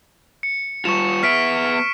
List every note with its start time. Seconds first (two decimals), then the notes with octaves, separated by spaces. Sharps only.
0.43 C#7
0.85 G3 F4 C#6 E7
1.23 B3 E5 F6 B6 D7